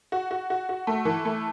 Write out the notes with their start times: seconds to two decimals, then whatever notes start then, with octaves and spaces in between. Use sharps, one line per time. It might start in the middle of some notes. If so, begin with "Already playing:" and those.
0.12 F#4
0.31 F#4
0.50 F#4
0.69 F#4
0.87 A3
1.05 E3
1.25 A3